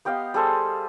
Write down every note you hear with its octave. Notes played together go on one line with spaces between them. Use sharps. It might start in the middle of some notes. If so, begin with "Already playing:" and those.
B3 G4 D#5 F5
G3 G#4 A4 C5